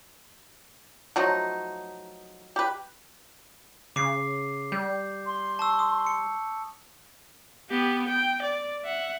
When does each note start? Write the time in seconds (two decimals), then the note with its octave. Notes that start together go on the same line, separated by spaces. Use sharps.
1.16 F3 F#3 A3 D#4
2.56 G4 B4
3.96 C#3 D6 C7
4.72 G3 G6
5.26 C6
5.59 A5 C#6 E6
5.79 D#6
6.06 C#7
7.70 B3 G4
8.08 G5
8.42 D5
8.85 E5 F#5